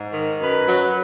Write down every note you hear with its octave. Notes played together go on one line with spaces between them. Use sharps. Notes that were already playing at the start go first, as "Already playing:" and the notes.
Already playing: G#2
D#3
F#2 B4
F#3